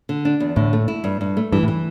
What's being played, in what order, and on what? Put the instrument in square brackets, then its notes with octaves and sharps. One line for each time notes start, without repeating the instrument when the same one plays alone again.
[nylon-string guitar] D3
D4
E2
[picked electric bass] A2 [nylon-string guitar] D3
[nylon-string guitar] A3
E4
G2
G2
A3
[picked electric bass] G2 [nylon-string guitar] E3
[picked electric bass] A2
[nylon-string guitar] E3